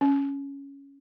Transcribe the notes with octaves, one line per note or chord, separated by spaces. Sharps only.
C#4